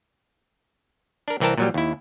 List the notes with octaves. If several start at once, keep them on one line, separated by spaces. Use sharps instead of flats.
D4 A#4
C2 E3 C4 A#4 A5
A#2 F#3 G3
D#2 E4